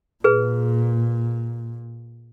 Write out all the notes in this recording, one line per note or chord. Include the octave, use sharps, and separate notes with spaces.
A#2 G#4 B4